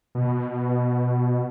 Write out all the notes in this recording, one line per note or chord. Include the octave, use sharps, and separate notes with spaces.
B2